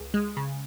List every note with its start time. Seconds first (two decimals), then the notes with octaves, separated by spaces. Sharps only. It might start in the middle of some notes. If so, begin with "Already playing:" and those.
Already playing: C#2
0.14 G#3
0.37 C#3